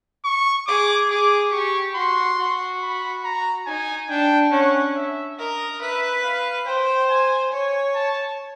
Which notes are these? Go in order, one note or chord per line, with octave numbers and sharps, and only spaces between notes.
C#6
G#4 D6
G#4 D6
G4 C#6
F#4 C6
F#4
B5
A#5
D#4 G#5
D4 G5
C#4 F#5
E5
A#4 D#5
B4 E5
F5
C5 G5
G#5
C#5 G#5
A5